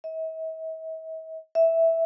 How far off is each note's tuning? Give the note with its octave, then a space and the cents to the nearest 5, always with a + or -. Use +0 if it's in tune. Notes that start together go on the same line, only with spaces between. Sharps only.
E5 -45
E5 -5